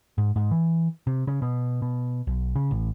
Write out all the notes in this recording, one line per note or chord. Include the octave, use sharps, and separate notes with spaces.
G#2
G#2
E3
C3
C#3
B2
B2
B1
C#3
A1